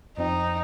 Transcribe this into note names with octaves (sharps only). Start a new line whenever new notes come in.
F2 F3 C4 D#4